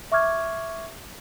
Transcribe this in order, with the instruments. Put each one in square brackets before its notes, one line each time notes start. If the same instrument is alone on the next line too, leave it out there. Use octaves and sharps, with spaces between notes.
[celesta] E5 C#6 D6 F6 G#6